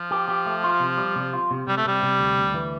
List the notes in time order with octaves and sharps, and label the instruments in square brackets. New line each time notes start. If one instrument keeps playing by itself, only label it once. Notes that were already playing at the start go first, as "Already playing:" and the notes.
Already playing: [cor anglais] F3
[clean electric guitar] G4
G4
A3
F4
C3
G3
C3
F4
C3
[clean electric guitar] C3 [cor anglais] G3
[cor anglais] A3
[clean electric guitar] C3 [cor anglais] G3
[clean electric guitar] C3
D2
D2
E3